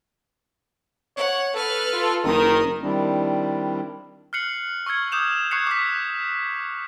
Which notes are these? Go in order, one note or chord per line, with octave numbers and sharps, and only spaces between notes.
C#5 F#5
A4 B4 F6
F4
F#1 D#3 A#4 D#6
D#3 G3 C4 D4 E4
F6 F#6 C7 C#7 F#7
C#6 E6 F6 G#6 C#7
D6 D#6 G6 E7 F7
C#6 F#6 G#6 C7 C#7
D6 D#6 B6